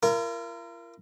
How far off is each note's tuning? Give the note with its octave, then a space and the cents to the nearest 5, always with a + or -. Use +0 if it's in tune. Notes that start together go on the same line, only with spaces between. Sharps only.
F4 -45 A#4 +0